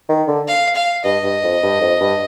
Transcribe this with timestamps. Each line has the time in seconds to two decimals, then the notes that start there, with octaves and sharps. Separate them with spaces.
0.09 D#3
0.28 D3
0.48 F5
0.76 F5
1.05 G2 D#5
1.24 G2
1.43 F2
1.63 G2
1.81 F2
2.00 G2